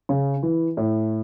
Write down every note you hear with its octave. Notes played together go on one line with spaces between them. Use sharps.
C#3
E3
A2